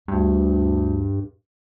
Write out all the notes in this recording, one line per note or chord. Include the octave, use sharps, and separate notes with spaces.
D2 G2